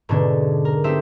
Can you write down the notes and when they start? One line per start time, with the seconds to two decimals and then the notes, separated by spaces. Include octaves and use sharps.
0.09 G#2 B2 D3 C#4 D4
0.65 A#4
0.84 A3 C4 D#4 G4 C5 E5